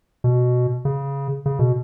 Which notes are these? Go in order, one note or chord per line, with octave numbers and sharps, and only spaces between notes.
B2
C#3
C#3
B2